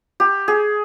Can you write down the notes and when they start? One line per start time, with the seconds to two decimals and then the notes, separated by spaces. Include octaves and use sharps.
0.20 G4
0.48 G#4